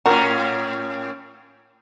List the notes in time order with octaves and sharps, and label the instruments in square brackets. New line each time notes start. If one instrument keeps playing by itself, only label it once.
[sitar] A2 A#3 C#4 [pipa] F#4 A#4